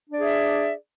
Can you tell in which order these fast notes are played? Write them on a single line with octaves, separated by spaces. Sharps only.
D4 D5 G#4 E5